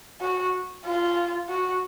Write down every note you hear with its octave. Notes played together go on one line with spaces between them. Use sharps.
F#4
F4
F#4